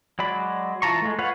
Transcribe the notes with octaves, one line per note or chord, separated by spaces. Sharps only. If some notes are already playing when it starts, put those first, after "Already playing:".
F#3 G#3 D5 B5
E3 F4 A5 A#5 C#6
G#3 A3
F4 B4 C#5 F5 F#5